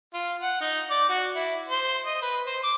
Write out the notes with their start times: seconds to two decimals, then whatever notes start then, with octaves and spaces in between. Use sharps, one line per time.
0.14 F4
0.42 F#5
0.61 D#4
0.90 D5
1.09 F#4
1.35 E4
1.68 C5
2.06 D#5
2.22 B4
2.46 C5
2.63 D6